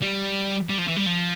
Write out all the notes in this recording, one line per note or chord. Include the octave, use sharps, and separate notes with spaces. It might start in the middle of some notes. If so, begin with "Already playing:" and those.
G3
G3
F3
E3
G3
F3